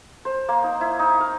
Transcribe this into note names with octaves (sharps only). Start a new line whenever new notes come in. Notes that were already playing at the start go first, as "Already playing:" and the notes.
C5
A#3
D#4
E4
D#4
F5